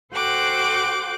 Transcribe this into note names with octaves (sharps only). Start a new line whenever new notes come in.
F#4 A4 C5 G5 D6 F#6